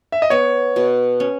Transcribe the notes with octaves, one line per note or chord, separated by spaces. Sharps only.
E5
D#5
B3 C#5
B2
C#4